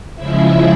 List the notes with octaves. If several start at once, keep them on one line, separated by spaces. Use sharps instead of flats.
C#3 F3 G#3 E4 E5